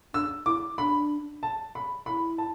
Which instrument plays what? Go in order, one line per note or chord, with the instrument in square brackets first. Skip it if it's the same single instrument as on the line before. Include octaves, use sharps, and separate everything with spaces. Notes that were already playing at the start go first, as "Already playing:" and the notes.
[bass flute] D4 [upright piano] E6
[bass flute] E4 [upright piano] D6
[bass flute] D4 [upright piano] B5
[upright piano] A5
B5
[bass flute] E4 [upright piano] B5
[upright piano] A5